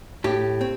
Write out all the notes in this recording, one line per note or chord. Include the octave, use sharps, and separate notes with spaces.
A2 G4
C4